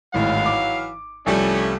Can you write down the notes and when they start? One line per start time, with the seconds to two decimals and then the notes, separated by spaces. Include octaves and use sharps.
0.14 G#1 A2 E3 F#3 F5
0.46 D6
1.26 C2 F3 G3 A3 C#4